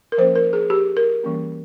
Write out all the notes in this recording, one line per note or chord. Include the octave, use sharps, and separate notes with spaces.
A#4
F3 A#3 C#4 C5
A#4
G#4
G4
A#4
E3 G3 A#3 C#4